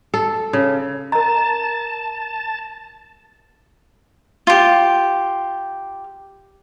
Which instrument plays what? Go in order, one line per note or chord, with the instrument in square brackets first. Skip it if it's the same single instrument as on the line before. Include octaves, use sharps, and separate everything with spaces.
[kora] A4
C#3
[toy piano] A#4 A#5 [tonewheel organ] A5
[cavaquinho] F4 G4